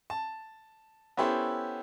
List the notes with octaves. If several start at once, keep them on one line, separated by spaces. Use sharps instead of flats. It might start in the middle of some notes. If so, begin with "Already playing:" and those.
A5
B3 C#4 E4 G4 A4 C5